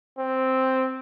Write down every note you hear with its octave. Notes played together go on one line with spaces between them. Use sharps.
C4